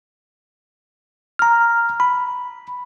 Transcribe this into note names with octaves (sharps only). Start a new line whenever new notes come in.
A#5 F6
B5